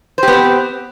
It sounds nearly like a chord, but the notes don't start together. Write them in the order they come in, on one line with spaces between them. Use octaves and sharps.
C5 G4 B3 C4